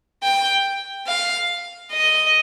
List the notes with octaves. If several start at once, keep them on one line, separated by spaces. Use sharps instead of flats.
G5
F5
D#5